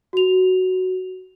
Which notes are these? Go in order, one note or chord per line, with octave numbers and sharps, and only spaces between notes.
F#4 F7